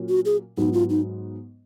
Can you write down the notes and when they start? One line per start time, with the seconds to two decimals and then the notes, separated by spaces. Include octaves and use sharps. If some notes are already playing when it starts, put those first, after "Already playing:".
Already playing: A#2 F#3 A#3 C#4
0.09 F#4
0.25 G#4
0.57 G#2 F#3 B3 D#4
0.73 F4
0.89 D#4